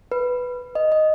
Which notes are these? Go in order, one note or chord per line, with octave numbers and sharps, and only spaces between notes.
B4
D#5
D#5